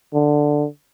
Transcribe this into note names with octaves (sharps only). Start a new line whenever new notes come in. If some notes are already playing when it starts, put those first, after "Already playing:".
D3